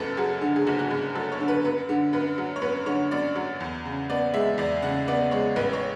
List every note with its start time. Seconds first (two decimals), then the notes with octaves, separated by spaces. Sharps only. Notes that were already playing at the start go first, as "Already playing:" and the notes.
Already playing: F#1 F#2 A4 B4
0.17 F#3 G#4
0.41 D3
0.56 G#4
0.66 F#1 F#4
0.79 F#4
0.90 F#2 G#4
1.15 F#3 A4
1.32 C#5
1.40 D3
1.48 B4
1.65 F#2 B4
1.89 D3
2.13 F#2 B4
2.38 F#3
2.56 C#5
2.62 F#2 B4
2.86 D3 C#5
3.11 F#2 D5
3.35 F#3
3.60 E2
3.85 C#3
4.10 B3 D5
4.34 G#3 E5
4.58 E2 D5
4.82 C#3 F#5
5.08 B3 D5
5.31 G#3 C#5
5.56 A1 B4
5.73 C#5